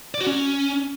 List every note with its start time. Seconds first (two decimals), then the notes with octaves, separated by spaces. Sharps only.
0.14 D5
0.20 F#4
0.27 C#4